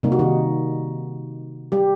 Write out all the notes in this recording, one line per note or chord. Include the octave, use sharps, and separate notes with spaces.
C3 G3 A#3 D#4
F#4
D#3 D#4
G3 G4